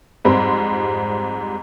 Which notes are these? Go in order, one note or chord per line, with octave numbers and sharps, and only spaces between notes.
F2 G#2 G3 C4 B5 C6